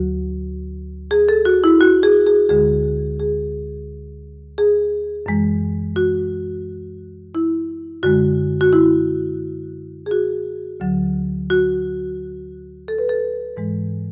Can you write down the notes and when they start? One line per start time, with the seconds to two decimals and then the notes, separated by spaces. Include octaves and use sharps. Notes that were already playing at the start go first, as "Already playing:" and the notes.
Already playing: D2 D3 F#3 F#4
1.11 G#4
1.29 A4
1.45 F#4
1.64 E4
1.81 F#4
2.03 G#4
2.27 G#4
2.49 D2 D3 G#3 G#4
3.20 G#4
4.58 G#4
5.26 F#2 E3 G#3
5.96 F#4
7.35 E4
8.03 F#2 D3 G#3 F#4
8.61 F#4
8.73 E4
10.06 G#4
10.11 F#4
10.80 D2 D3 F#3
11.50 F#4
12.88 A4
12.98 B4
13.09 A4
13.57 G#2 E3 G#3